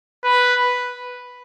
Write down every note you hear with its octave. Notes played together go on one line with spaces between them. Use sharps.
B4